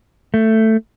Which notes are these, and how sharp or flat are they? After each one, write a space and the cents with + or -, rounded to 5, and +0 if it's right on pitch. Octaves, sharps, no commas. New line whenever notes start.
A3 +10